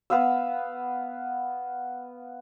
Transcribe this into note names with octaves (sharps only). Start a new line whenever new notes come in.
B3 B4 F5 E6